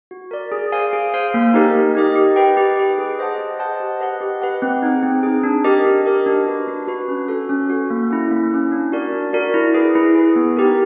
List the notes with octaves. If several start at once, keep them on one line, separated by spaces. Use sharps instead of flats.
F#4
A#4 D5
G#4
C5 F5 G#5
G#4
C5 F5 G#5
A#3
D#4 G4 A#4 D#5
A#3
D#4 G4 A#4 D#5
G4
B4 D#5 G5
G4
B4 D#5 G5
G#4
C5 D#5 F#5 A5
G#4
C5 D#5 F#5 A5
G4
B4 D#5 F#5
G4
B4 D#5 F#5
C4
D#4 G#4
C4
D#4 G#4
D4
G4 A#4 D#5
D4
G4 A#4 D#5
D4
F#4 B4
D4
F#4 B4
C#4
F#4 A4
C#4
F#4 A4
A#3
C#4 E4
A#3
C#4 E4
D4
F#4 A#4 D5
D4
F#4 A#4 D5
E4
G#4 B4
E4
G#4 B4
B3
D#4 G4 A#4